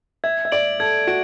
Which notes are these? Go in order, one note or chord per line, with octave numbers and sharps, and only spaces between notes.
E5 G#6
E5
D5 D7 F#7
A4 G#6
F#4 D7